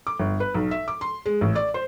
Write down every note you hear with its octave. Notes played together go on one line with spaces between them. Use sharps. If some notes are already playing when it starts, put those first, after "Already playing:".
D6
G1
B4
B1
E5
D6
C6
G#3
A1
D5
C5